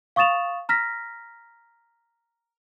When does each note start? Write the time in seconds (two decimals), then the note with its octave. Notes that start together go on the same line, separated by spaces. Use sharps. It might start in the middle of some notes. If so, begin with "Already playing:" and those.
0.16 F5 C#6 D#6 A6 E7 F7
0.69 A#5 F6 A#6 B6